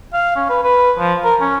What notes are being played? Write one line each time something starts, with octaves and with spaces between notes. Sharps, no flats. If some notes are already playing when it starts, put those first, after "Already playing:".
F5
C#4
B4
B4
F3
A#4
C#4